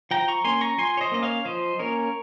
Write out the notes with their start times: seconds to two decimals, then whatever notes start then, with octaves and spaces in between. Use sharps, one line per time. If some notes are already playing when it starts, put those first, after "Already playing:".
0.11 F3 G5 A#5
0.28 A#5 C#6
0.44 A#3 C#4 G#5 C6
0.61 A#5 C#6
0.78 F3 G#5 C6
0.97 C#5
1.01 C5 D#5
1.12 A#3 C#4 D#5
1.23 C#5 F5
1.45 F3 C5 D#5
1.79 A#3 C#4 A#4 C#5